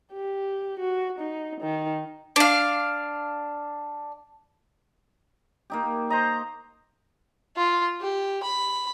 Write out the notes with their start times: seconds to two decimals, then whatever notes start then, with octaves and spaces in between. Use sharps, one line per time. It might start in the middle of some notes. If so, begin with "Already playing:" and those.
0.13 G4
0.79 F#4
1.19 D#4
1.61 D#3
2.36 D4 F5
5.70 A#3 D#4 G4
6.10 C5 D#5 A#5
7.56 F4
8.01 G4
8.43 B5